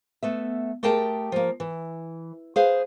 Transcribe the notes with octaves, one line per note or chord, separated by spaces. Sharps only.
A3 B3 E5
A3 G4 G#4 A#4 G5 A5
F3 A#3
E3
G#4 B4 C5 F5